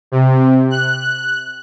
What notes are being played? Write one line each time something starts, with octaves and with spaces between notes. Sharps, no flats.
C3
F#6